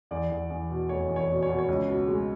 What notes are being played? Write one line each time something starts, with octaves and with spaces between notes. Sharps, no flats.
E2 D5
E2
E2
B2
F1 C#5
E2
C#5
B2
C#5
B2
C#5
C#2
B2
G#3